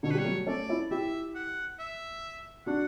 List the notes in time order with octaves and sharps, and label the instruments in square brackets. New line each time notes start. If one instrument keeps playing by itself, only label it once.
[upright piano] B2 D3 [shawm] C#5
[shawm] B4
[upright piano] G3 [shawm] C#5
[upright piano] F#3 A3
[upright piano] A3 C#4 [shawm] D5
[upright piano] C#4 E4
[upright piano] E4 G4 [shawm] E5
[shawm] F#5
E5
[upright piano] D4 F#4 [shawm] F#5